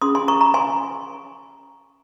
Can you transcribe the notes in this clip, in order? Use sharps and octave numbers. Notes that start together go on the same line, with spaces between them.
C#4 F4 G#4 C6 D#6
G#5 C6
A#5 C#6
A#5 C#6
G#5 C6